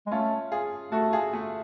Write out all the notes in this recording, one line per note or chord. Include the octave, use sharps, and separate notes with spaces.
G#3
A3 C#4 F4
F4 G#4
A3 F#4 A4
F4 G#4
A3